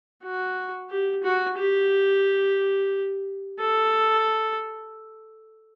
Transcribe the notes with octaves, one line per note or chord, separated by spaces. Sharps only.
F#4
G4
F#4
G4
A4